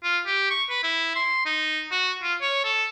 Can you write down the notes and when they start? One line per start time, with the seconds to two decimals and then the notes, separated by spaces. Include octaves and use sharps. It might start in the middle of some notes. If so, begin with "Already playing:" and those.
0.03 F4
0.26 G4
0.50 C#6
0.70 B4
0.83 E4
1.16 C6
1.46 D#4
1.91 F#4
2.23 F4
2.42 C#5
2.64 A4